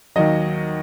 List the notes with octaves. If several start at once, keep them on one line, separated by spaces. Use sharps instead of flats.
D#2 D#3 F#3 D#5